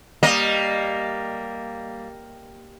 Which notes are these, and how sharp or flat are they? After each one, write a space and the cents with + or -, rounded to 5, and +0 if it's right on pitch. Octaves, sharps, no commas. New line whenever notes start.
G3 +0 A#3 +0 D#5 -10